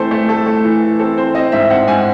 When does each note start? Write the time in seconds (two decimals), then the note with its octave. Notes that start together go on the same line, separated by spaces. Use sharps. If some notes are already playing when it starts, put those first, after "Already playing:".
Already playing: E3 A3 C4 A4 C5
0.11 A3
0.29 A3 A4
0.47 A3
0.64 E3
0.82 E3
0.99 C4 A4
1.17 C4 C5
1.35 C4 D#5
1.52 G#2 E5
1.70 C4 F#5
1.87 G#2 G#5